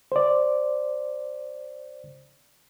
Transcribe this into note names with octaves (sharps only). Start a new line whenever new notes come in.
C5 D5